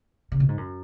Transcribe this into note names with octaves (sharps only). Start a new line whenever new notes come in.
C#3
B2
G#2
F#2